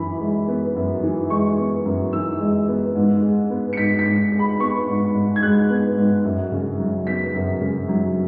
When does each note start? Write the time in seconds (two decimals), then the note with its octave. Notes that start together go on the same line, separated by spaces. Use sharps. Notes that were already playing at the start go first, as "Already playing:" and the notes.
Already playing: F#2 E3 B5
0.21 G#3
0.48 B3
0.76 F#2
1.03 E3
1.30 G#3 C#6
1.59 B3
1.85 F#2
2.13 E3 E6
2.40 G#3
2.68 B3
2.95 G#2
3.22 G#3
3.50 B3
3.73 C#7
3.77 G#2 B6
3.99 B6
4.06 G#2
4.32 G#3
4.39 B5
4.60 B3 C#6
4.88 G#2
5.15 G#2
5.36 G#6
5.43 G#3 F#6
5.70 B3
5.97 G#2
6.25 F#2
6.52 C#3
6.79 F#3
7.07 B3 B6
7.34 F#2
7.61 C#3
7.89 F#3